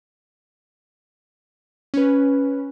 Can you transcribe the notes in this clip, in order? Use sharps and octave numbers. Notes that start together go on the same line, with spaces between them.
C#4 B4